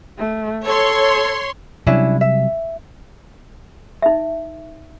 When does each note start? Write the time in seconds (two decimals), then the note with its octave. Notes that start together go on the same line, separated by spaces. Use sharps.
0.17 A3
0.65 A4 C#5 C6
1.87 C3 F#3 G3 C#4 D4 E4
2.21 E5
4.02 D#4 E5